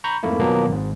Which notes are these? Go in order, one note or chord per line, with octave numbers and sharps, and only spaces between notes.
A#5 B5 C#6 G6
F2 G#2 A3 A#3 E4
B2 D#3 F3 F#3 A#3 B3
G#1 G#2